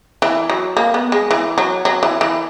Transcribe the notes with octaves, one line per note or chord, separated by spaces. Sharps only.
E3
F#3
A#3
B3
G#3
E3
F#3
F#3
E3
E3